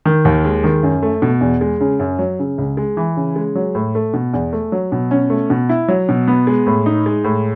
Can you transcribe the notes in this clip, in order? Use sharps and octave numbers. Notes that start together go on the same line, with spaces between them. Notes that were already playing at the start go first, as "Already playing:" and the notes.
D#3
D#2
G#3
D#3
F#2
A3
B2
E2
G#3
C#3
F#2
F#3
C#3
C#2
G#3
E3
C#3
G#3
F#3
A2
A3
B2
E2
A3
F#3
B2
C#4
A3
B2
E4
F#3
B2
B3
G#3
A2
D#4
G#3
A2